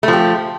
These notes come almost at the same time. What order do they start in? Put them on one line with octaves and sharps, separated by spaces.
A3 F3 G4